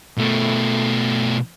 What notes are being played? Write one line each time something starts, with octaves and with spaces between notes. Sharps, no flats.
B2 A3